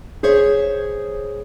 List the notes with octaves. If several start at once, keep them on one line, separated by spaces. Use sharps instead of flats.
G#4 C5 C#5 E5